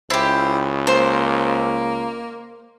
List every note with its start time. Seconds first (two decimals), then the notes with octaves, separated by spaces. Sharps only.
0.10 C#2 E4 G4 C5
0.87 A#3 C5